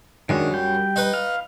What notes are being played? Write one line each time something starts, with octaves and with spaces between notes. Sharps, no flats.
F#2 D#3 G#3 D4
G3 G5
D#4 B4
F5